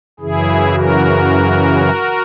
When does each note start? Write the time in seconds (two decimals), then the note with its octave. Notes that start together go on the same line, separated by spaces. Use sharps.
0.20 F#2 C#3 E3 E4 G#4
0.73 F#4 A#4